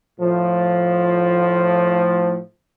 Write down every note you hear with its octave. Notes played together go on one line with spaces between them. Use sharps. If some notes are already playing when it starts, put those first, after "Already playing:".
A2 F3